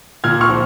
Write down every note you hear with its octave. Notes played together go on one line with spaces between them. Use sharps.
A#2 F6 G#6
C#6 F6
F3